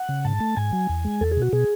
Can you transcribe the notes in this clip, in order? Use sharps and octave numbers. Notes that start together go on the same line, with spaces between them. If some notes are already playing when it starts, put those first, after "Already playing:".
Already playing: F#5
C#3
G#2 A5
A3
G#2 G#5
F#3
E2
G#3
E2 A4
G#4
B2 F#4
B2 G#4